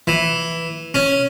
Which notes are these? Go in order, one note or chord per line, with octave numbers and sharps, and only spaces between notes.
E3
C#4